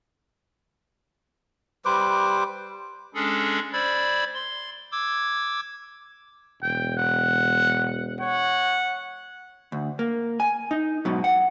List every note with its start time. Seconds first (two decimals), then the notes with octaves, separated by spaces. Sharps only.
1.85 G3 B4 C5 D6
3.14 G#3 C#4 D4 G#4 A4
3.73 C5 D5 B5 E6 G#6
4.34 C6
4.92 D6 E6 G#6
6.62 E1 G5
6.97 F#5
8.20 C#5 F#5
9.72 D2
9.99 A#3
10.40 G#5
10.71 D#4
11.05 G#2 B2 F#3
11.24 F#5